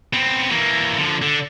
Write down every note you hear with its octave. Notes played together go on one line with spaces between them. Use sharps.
B3 C4
E3 A#3
D3 F3
D3